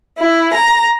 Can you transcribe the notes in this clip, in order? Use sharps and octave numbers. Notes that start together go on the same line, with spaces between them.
E4
A#5